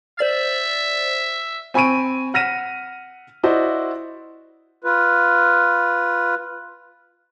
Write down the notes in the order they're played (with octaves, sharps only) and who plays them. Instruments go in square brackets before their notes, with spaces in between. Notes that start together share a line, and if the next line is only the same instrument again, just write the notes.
[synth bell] C5 D5 A6 [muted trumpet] E5
[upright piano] C4 G#5 B5 C#6 D7 D#7
F#5 F6 A#6 B6 D#7 E7
E4 F#4 C5 D5 D#5
[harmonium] F4 B4